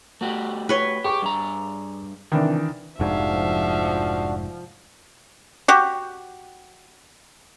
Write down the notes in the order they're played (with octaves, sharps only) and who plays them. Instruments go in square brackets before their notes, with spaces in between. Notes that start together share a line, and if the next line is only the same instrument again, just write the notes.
[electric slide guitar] A3 F#4 G4
[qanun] B4 C#5 C6
[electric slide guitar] G4 [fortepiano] G#4 C#6 D6
[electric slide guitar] G2 A#5
[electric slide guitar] C3 [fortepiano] D#3 E3 D4
[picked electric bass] F1 G#2 [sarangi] F3 [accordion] D4 F#4 [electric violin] E5 F5
[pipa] F#4 G4